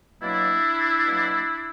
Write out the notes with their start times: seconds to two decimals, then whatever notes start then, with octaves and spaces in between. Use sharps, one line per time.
0.20 B2 F#3 A#3 D4 E4
1.06 B2 F#3 A#3